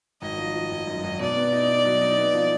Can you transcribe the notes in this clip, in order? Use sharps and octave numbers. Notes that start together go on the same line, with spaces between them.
G#1 D#5
F3
F3
G#1
F#2
G#1
B2 D5
B3
D#4
D#4
F#3
D#4
B3
F3